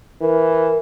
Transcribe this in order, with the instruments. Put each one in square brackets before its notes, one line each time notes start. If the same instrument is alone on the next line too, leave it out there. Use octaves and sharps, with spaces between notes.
[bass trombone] E3 [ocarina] A#4